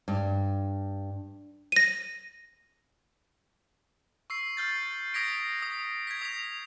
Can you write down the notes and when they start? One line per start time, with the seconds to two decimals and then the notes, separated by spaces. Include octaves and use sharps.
0.08 G2
1.72 A#6 D#7
4.30 C#6 E6 C7
4.57 F6 G6 A6
5.14 D#6 G#6 A#6 B6 D7
5.62 D#6
6.07 G#6 B6
6.22 D#6 B6 F7